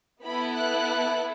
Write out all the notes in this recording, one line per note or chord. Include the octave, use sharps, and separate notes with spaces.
B3 E4 A4 B5
F#6